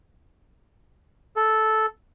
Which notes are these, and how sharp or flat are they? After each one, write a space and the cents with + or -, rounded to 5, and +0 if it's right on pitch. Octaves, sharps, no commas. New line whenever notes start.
A4 -10